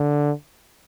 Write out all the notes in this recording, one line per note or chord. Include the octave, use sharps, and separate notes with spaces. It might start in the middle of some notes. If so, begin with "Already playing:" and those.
Already playing: D3